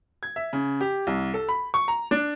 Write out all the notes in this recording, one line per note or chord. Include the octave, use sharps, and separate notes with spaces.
G#6
E5
C#3
G4
C2
A4
B5
C#6
A#5
D4